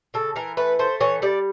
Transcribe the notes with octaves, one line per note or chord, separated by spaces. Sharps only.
C#3 A4
E3 A#4
A3 B4
A3 C5
E3 C#5
G3 D5